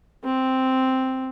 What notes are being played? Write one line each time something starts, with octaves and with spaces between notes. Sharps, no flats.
C4